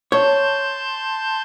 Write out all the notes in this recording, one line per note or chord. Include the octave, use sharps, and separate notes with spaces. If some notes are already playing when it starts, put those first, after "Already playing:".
C#5 A5 C6 G6